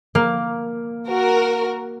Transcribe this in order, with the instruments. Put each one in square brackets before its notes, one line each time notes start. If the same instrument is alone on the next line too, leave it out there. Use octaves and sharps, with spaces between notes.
[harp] A#3
[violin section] F#4 A#4